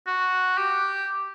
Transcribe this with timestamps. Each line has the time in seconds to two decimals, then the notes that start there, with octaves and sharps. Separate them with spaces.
0.07 F#4
0.58 G4